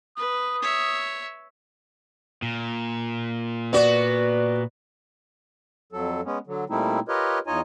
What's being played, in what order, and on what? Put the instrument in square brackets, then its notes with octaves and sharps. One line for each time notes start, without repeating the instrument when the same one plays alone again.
[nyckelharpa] B4 [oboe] D#6
[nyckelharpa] C#5 E5
[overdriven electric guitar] A#2
[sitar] B3 F#4 [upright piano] D5
[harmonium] F2 F#3 A4
G#3 B3 C#4
D3 F#3
A#2 G3 A3 C4 D#4 E4
F4 G4 A#4 B4 C#5 D#5
E2 D#4 F4 C#5 D#5 G#5